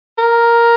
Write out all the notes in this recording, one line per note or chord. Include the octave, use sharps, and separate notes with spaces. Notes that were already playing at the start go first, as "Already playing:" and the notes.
A#4